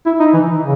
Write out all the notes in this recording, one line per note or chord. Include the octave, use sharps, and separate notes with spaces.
E4
D#4
E3
C#3